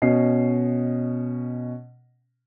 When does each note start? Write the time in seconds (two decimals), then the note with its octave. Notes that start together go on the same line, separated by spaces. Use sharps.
0.02 B2 C#4 D#5 C7